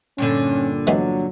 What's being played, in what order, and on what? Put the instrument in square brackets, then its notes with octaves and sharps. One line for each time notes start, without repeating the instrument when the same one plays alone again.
[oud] G2 A#2 D3 [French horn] C#4
[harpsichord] E3 G#3 B3 [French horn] F#3